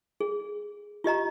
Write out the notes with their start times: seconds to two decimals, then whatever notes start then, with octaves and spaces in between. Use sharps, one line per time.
0.20 G#4
1.04 F4 G4 D#5 A#5